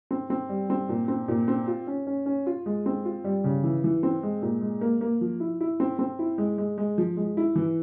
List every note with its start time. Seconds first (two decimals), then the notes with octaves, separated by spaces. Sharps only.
0.11 C4
0.30 C4
0.49 G3
0.70 C4
0.89 A#2
1.08 C4
1.28 A#2
1.48 C4
1.67 F4
1.87 C#4
2.07 C#4
2.26 C#4
2.46 F4
2.66 G#3
2.86 C4
3.05 F4
3.24 G3
3.44 C#3
3.64 E3
3.84 E3
4.03 C4
4.23 G#3
4.42 A#2
4.61 G#3
4.81 A#3
5.01 A#3
5.21 F3
5.40 E4
5.60 E4
5.80 C4
5.99 C4
6.19 E4
6.38 G#3
6.58 G#3
6.78 G#3
6.98 F3
7.17 G#3
7.37 E4
7.55 E3